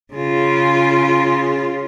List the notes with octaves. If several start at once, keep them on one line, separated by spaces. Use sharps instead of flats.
C#3 F4